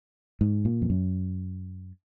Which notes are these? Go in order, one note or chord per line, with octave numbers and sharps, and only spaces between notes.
G#2
A#2
F2
F#2